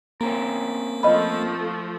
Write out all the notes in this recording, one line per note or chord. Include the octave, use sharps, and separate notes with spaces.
A#3 C4 C#4 A#4
F3 A3 D#5 B5